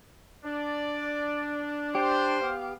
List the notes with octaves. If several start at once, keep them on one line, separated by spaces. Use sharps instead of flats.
D4 D5
G4 C5
B3 F5